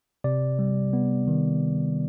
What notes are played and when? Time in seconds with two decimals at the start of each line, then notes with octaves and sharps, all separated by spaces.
0.24 C3 D5
0.59 G3
0.93 B3
1.28 D#3